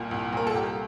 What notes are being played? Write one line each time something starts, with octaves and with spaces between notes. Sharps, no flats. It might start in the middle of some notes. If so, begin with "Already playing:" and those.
Already playing: C2 A#2
C2
A#2 A#4
A4
C2 G4